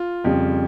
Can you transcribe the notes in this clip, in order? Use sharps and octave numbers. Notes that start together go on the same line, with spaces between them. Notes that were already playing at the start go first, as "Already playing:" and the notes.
Already playing: F4
F2 C#3 G3